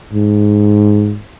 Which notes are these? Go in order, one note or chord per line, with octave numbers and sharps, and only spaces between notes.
G#2